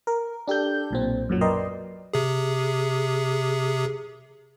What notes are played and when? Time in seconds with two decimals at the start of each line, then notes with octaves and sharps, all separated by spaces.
0.07 A#4
0.48 D4 G4 A4 G6
0.91 B1 A#2 C4
1.29 F#2 A#2 F#3
1.41 A#4 B4 D5 D#5 G5 C6
2.14 C3 G#4